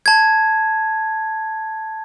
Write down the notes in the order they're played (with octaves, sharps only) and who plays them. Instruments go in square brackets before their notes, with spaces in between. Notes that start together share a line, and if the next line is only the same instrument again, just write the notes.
[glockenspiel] A5 G#6